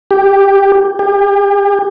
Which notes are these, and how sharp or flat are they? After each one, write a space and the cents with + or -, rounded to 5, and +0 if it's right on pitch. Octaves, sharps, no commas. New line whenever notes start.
G4 +10
G4 +40